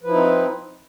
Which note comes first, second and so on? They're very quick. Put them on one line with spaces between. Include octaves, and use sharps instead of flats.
F3 B4 E4 D#4 C4